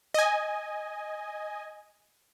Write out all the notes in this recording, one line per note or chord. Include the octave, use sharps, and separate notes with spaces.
D#5 G#5